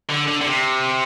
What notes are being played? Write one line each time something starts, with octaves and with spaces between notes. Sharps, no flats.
D3
D3
D3
C3